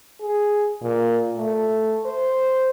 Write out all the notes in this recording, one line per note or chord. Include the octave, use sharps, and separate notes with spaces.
G#4
A#2
A3
C5